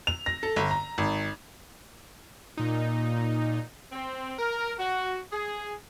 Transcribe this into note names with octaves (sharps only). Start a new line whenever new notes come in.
F7
A#6
A4
G1
A#5
G#1
A#2 D#4
C4
A#4
F#4
G#4